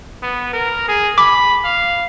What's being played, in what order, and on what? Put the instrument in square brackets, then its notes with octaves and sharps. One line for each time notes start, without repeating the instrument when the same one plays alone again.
[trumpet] B3
A#4
G#4
[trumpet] B5 [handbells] D6
[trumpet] F5